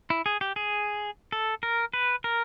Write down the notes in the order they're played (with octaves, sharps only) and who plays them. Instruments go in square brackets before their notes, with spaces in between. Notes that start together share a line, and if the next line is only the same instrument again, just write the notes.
[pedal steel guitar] E4
G#4
G4
G#4
A4
A#4
B4
A#4